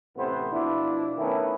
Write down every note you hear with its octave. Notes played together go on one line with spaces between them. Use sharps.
A1 C3 A3 B3 B4 C5
B2 F3 D4 E4
D#3 A3 B3 C#4 E4